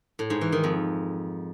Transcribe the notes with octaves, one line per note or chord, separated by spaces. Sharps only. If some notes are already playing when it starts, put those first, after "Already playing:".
A2
G#2
E3
D#3
F2